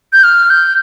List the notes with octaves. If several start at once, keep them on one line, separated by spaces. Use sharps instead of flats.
G6
F6
G6